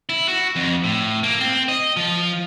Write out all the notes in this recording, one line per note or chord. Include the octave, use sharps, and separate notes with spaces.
E4
F#4
F2
A2
A#3
C4
D#5
F3